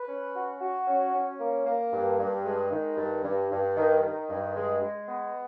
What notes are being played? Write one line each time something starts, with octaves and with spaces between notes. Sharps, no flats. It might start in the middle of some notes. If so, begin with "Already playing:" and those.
Already playing: B4
C#4
F#4
F#4
C#4
C#4
A#3
A#3
G2
G2
G#3
D#3
G2
G2
G2
D#3
D#3
G2
G#3
G#3
B3